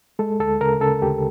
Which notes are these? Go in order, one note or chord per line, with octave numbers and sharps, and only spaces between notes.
G#3 A4
D2 A4
C#3 A#4
C#3 A4
D2 G4